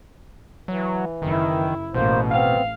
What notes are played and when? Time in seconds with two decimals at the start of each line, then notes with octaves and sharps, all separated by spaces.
0.68 E3 F#3
1.22 F#1 D#3 E4
1.95 A1 B2 A#3 C5
2.31 B3 C4 F5